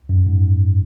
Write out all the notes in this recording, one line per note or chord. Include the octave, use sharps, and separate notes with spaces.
F#2
G#2